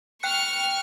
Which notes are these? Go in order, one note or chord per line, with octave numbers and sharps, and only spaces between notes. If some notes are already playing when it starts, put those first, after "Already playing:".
G5 C#6 F6 F#6 C#7